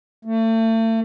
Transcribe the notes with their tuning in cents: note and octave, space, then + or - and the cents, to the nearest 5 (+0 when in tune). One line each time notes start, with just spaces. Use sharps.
A3 +40